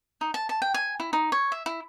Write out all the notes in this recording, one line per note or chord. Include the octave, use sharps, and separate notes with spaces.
D#4
A5
A5
G5
G#5
E4
D#4
C#5
E5
E4